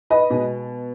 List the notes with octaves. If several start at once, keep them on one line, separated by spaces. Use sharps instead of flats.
B4 D#5
B2 G#3